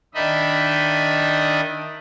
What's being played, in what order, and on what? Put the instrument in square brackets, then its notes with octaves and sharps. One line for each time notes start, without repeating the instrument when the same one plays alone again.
[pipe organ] D#3 D4 D#4 D#5 E5 B5